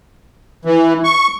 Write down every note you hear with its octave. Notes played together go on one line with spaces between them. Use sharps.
E3
C#6